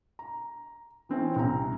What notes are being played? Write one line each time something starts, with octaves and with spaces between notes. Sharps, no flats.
A#5
E3 C4 C#4 E4
C2 A#5